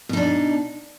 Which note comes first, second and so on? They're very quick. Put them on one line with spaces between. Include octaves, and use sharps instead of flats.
B2 D#4 D4